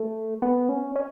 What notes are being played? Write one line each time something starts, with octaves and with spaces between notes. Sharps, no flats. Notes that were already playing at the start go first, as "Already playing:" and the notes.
Already playing: A3
B3
C#4
C#4